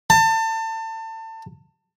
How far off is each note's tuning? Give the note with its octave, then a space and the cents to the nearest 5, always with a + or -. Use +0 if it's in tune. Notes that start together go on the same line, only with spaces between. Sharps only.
A5 +30